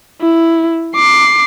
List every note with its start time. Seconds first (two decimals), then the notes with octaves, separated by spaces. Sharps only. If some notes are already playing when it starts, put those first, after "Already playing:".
0.21 E4
0.96 D6 C7